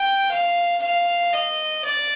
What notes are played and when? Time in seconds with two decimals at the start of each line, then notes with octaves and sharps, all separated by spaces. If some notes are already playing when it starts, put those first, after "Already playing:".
Already playing: G5
0.30 F5
0.81 F5
1.33 D#5
1.84 D5